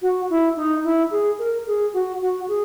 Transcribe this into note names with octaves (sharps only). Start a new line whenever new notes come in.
F#4
E4
D#4
E4
G#4
A#4
G#4
F#4
F#4
G#4